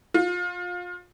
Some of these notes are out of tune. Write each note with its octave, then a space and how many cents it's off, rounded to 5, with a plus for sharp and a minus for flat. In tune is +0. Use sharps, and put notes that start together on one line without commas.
F4 +25